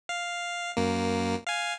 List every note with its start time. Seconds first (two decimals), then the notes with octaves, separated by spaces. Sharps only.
0.09 F5
0.77 F#2 A#3
1.47 F5 G#5